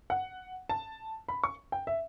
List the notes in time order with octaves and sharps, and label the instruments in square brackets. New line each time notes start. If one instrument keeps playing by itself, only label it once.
[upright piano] F#5
A5
B5
C#6
G5
E5